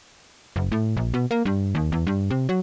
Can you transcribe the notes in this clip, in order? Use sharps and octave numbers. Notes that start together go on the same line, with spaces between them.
F#1
A2
A#1
B2
A#3
G2
D#2
E2
G2
C3
F#3